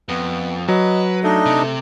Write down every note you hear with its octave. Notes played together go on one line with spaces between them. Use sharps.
F2 B3
F#3 B4 D#5
A3 D4 D#4 D#5
C3